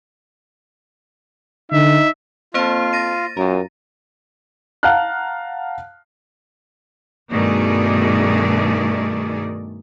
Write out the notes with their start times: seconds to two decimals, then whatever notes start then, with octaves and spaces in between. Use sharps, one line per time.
1.72 D3 D#4 E5
2.54 A#3 C4 F4 A4 C5
2.93 A6 A#6 D#7
3.37 F#2 F4 A#4
4.83 F5 F#5 A5 A#5 F6 F#6
7.31 G2 B2 D#3 A3 G#4 D5